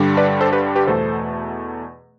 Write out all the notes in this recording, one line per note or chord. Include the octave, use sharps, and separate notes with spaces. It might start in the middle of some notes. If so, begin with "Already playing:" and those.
Already playing: G2 D3 G3
B4 D5
A4 C5
G4 B4
G4 B4
E2 B2 A3 A4 C5